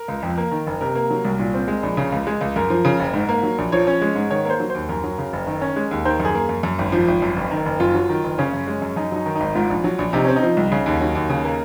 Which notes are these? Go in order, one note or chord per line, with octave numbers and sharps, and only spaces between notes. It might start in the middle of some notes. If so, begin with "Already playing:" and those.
Already playing: A#4
C#2
F2
A#3
D#3
F#1
C3 A#4
A#3
F#3
C2
A#2
C4
G#3
A#1
C#3
C#2
G#3
C#2
F#2 A#4
F3
C#3
F#1
G#2
A#3
F#3
A#1
F3 C#5
C#4
G#3
G#2
D#3 C#5
A#3 C5
F#3
D#2 C5
F#2 A#4
F#3
C#3
F#1
D#3
C#4
G#3
D#2
D#3 C5
F#2
G#4
A#3
F#2
F#2
G#1
F3
G#1
F#2
F#1
D#3
F#1
F#2 F4
F#3
D#3
F#1
C#3 C#4
F#2
G#3
F#2
F#2 D#4
F#3 D#4
D#3
G#1 D#4
G#2 F4
A#1
F#3
A#1
C3 D#4
C4 C#4
D#4
F3
C2
C#3
D#2
F#3
D#2
C#3
A#3